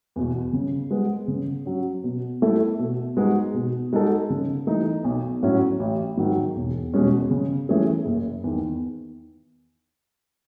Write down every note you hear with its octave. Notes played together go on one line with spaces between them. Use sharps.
E2 B2
C#3
G#3 B3
C#3
F#3 C#4
B2
A3 E4 A4
B2
G#3 B3 D#4 F#4
B2
G#3 D#4 F#4 A4
C#3
E3 A3 D#4
B1
A2 F#3 C#4
A1
G#2 D#3 F#3
E1
E2 B2 G#3 C#4
C#3
E3 A3 C#4 G#4
F#1
E2 D#3